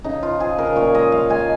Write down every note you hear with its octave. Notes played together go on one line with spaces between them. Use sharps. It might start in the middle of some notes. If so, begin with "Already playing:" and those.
C#3 D#4
F3 F4
F3 G#4
C#3 A#4
A#2 C#5
G#3 D#5
G#3 F5
G#3 G#5